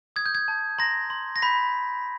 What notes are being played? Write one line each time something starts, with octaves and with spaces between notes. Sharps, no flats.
D#6 G#6
G6
G#6
A5
A#5 C6 A#6
C6
A#6
B5 G6 B6